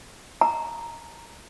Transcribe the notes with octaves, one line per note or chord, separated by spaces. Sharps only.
A#5